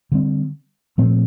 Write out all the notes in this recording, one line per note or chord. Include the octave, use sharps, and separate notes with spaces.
D3 G3 C4
A#2 F3 A3 C4